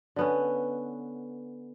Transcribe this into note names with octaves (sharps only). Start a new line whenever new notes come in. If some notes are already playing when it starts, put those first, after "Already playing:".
D3 B3 C#4